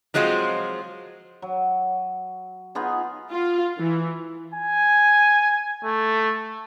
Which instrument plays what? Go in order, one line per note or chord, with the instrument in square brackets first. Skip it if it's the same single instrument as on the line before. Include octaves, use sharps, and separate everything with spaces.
[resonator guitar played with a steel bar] F3 F#3 G#3 C4 F4
[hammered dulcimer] F#3
B3 D#4 F4 G#4
[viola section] F4
E3
[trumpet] G#5
A3